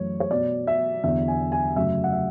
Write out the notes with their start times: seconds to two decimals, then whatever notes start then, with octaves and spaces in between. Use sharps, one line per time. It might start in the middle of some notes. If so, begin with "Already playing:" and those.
Already playing: F#2 E3 A3 C#5
0.20 C#5
0.30 B2 F#3 B3 D5
0.67 E5
1.03 E2 D3 F#3 E5
1.28 G#5
1.52 G#5
1.76 F#2 C#3 F#3 A3 E5
2.04 F#5
2.12 E5